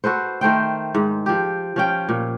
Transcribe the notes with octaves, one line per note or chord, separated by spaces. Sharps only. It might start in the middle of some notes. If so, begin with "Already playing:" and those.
F#4 A4 B4 C5
D#3 A3 C5 G5
G#2
F3 G4
F3 C#4 G5
A#2